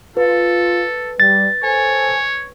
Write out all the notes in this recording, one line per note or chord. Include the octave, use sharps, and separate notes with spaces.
F4 A4 B4
G3 A6
A4 C5 C#5 G#5